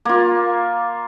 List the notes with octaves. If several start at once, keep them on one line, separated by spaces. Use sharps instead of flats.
A#3 F4